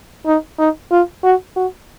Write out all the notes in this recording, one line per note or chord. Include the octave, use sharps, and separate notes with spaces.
D#4
D#4
F4
F#4
F#4